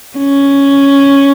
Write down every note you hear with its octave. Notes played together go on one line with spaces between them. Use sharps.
C#4